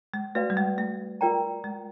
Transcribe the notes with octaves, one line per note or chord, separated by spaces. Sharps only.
G#3
A3 F#4 B4 D5 F5
G3
G#3
A3
F4 A#4 D5 G5 A#5
G#3